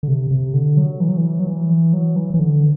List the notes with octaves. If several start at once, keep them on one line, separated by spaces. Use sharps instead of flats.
D3
C3
C3
D3
F#3
E3
F#3
E3
F#3
E3
F#3
E3
E3
D3